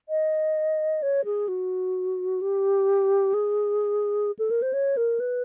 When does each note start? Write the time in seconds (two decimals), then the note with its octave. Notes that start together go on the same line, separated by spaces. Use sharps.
0.09 D#5
1.02 C#5
1.25 G#4
1.48 F#4
2.41 G4
3.34 G#4
4.39 A4
4.50 A#4
4.62 C5
4.73 C#5
4.97 A#4
5.20 B4